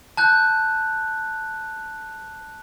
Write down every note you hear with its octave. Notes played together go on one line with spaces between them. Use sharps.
A5 F#6 G6